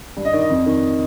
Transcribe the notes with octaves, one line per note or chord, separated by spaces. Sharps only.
G2
D#5
D#3 D5
D#5
F2
D#3